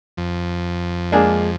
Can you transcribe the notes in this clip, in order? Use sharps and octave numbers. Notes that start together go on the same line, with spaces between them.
F2
G#3 A#3 D4 G#4